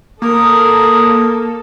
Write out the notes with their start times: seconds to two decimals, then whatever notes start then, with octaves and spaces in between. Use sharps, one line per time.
0.22 A#3 A4 A#4 D#6